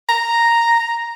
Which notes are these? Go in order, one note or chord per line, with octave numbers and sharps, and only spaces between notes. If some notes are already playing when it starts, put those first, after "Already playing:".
A#5